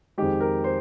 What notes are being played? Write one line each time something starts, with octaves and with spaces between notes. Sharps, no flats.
F2 D#3 G#3 G4
A#4
C5